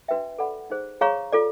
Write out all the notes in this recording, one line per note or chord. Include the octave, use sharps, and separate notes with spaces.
D4 F#4 B4 E5 G5
A4 D5 F#5 B5
D#4 G#4 C5
G#4 C#5 F5 A#5 C#6
F4 A4 D5